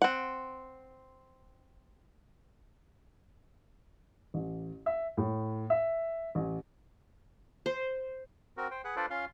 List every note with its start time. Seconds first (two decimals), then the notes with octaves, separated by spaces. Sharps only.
0.02 C4 F#5
4.34 A1
4.86 E5
5.17 A2
5.70 E5
6.35 A1
7.66 C5
8.57 C4 F#4 A#4
8.71 C5 G5
8.84 G#4 B4 F#5
8.96 D4 F4 A4 B4 C5 D5
9.10 C#4 F4 F5 C6